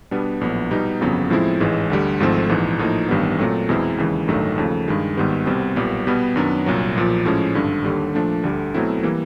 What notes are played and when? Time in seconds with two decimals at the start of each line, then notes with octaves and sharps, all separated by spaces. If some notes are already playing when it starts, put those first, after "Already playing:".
0.11 B2 G3 B3 D4
0.41 A#1 A2 F#3 B3
0.71 B2 G3 B3 D#4
1.01 G1 F2 C#3 F#3 B3
1.30 A2 F3 G#3 C4 E4
1.60 A1 G#2 E3 G#3
1.90 D2 D3 G3
2.20 G#1 G#2 F3 A3 C4
2.49 A#1 G#2 E3
2.79 A2 F3 A#3 D#4
3.08 A1 G2 D#3 G3 B3
3.39 A#2 F#3 A3 C4
3.69 E2 B2 G#3 C4 E4
3.98 D#2 C#3 E3 G#3
4.28 A1 G2 D#3 F#3 A3
4.58 D#2 C#3 F3 A3
4.88 G2 D#3 G#3
5.17 G#1 G#2 D#3 G3 B3
5.46 C2 B2 G3 C4
5.76 B1 A#2 G3 B3
6.07 B2 G3 B3
6.36 F#2 D#3 F#3 B3 D4
6.66 C2 A#2 F#3
6.95 B1 A#2 F3
7.25 A2 F3 G#3 C#4
7.55 G#1 G2 D3
7.84 D#2 D3 G3
8.15 A#2 F3 A3 D4
8.44 D2 D3 G3
8.74 B2 F#3 A3 C4 E4
9.03 E3 G3 A#3